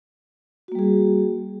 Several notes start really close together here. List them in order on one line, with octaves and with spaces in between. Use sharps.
F#4 A#3 G3 G#4